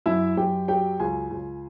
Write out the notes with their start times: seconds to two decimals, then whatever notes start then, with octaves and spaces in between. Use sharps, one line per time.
0.06 F#2 E4 E5
0.37 F#2 G4 G5
0.68 F#3 G4 G5
1.00 C#2 G#4 G#5
1.31 C#2